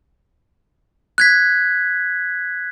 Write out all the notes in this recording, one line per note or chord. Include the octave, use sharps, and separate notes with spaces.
F#6 G#6 B6